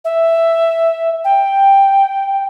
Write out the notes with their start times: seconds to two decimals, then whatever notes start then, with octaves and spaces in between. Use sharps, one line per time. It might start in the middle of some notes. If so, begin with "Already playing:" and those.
0.04 E5
1.24 G5